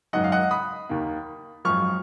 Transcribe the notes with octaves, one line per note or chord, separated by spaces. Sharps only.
G#1 F#2 D#3 F#3 D#5 F#5
F5
D#5 F#5
B5 D#6
D#2 D#3 A#3
G#1 F#2 F3 C#6 F6